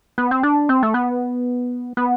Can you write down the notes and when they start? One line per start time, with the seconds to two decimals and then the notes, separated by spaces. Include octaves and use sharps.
0.18 B3
0.31 C4
0.43 D4
0.69 C4
0.83 A3
0.94 B3
1.97 B3